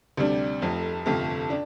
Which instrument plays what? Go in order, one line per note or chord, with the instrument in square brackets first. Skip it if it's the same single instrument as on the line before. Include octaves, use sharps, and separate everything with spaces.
[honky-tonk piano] D2 C3 G3 D4
F1 F2 F3 A3
G1 F2 C3 A3 F4
D4